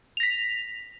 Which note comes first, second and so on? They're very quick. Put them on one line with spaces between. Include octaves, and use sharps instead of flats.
F7 A#6 B6